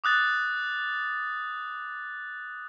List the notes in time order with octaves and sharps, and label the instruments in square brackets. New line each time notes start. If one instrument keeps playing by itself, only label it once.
[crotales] D6 D#6 F#6 A6